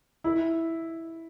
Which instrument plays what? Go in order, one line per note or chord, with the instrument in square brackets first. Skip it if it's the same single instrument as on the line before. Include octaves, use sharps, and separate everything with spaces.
[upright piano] E4